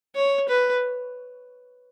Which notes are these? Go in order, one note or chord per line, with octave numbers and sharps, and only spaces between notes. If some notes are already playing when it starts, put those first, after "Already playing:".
C#5
B4